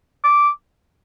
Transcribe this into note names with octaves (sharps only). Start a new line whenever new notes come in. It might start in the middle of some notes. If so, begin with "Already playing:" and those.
D6